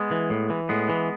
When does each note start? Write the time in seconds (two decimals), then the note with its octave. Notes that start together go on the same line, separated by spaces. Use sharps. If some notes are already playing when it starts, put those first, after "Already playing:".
Already playing: G#3 B3
0.11 E3
0.30 A2
0.50 E3
0.69 A2 G#3 B3
0.89 E3